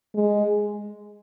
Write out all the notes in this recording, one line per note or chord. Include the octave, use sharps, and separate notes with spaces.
G#3